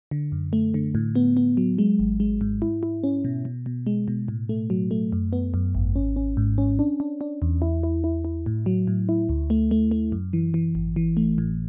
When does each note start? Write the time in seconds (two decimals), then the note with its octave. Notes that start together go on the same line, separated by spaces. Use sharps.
0.11 D3
0.32 F#2
0.53 A3
0.74 D3
0.95 A2
1.15 B3
1.37 B3
1.57 F#3
1.78 G#3
1.99 G#1
2.20 G#3
2.41 G#2
2.62 E4
2.83 E4
3.04 C#4
3.25 B2
3.45 B2
3.66 B2
3.87 G#3
4.08 B2
4.28 A2
4.49 A3
4.70 F#3
4.91 A3
5.12 F#2
5.33 B3
5.54 F#2
5.75 G#1
5.96 C#4
6.16 C#4
6.37 G#2
6.58 C#4
6.79 D4
7.00 D4
7.21 D4
7.42 E2
7.62 E4
7.83 E4
8.04 E4
8.25 E4
8.46 A2
8.66 F#3
8.88 A2
9.09 E4
9.29 D2
9.50 A3
9.71 A3
9.91 A3
10.12 F#2
10.33 E3
10.54 E3
10.75 G#1
10.96 E3
11.17 A3
11.38 A2